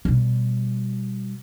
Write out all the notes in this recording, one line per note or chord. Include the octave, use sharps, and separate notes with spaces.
B2 G3